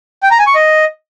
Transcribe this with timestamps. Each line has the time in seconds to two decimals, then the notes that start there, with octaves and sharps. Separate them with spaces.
0.23 G5
0.31 A#5
0.39 G#5
0.47 C#6
0.55 D#5